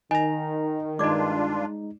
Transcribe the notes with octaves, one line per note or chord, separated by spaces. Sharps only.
D#3 D#4 G#5 A#5
G2 G#3 D4 D#4 F4 D5 D6